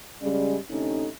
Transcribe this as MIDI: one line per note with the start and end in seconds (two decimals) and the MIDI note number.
0.22 0.56 49
0.22 0.56 55
0.22 0.56 56
0.22 0.56 61
0.22 0.56 74
0.71 1.07 38
0.71 1.07 48
0.71 1.07 57
0.71 1.07 61
0.71 1.07 63